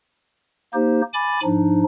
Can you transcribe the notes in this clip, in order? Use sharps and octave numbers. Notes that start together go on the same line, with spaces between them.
A#3 D#4 G4 C5
G#5 B5 D6 A6
G#2 F3 D4 D#4